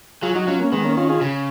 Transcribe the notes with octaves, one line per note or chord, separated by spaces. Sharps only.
F#3 F4 G#4
F#3 D#4 F#4
F#3 C#4 F4
A#3 C#4
D#3 G#3 B3
A#3 C#4
C#4 F4
F4 G#4
C#3